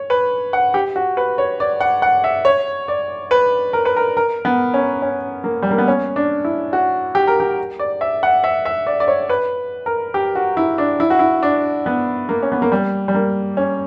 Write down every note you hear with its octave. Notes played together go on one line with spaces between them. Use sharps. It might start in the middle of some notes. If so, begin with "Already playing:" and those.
Already playing: C#5
B4
F#5
G4
F#4
B4
C#5
D5
F#5
F#5
E5
C#5
D5
B4
A#4
B4
A#4
A#4
B3
C#4
C#4
A#3
G3
A#3
B3
C#4
D4
E4
F#4
G4
A#4
G4
D5
E5
F#5
E5
E5
D5
D5
C#5
B4
A#4
G4
F#4
E4
D4
E4
F#4
E4
D4
B3
A#3
C#4
B3
A#3
G3
G3
A#3
C#4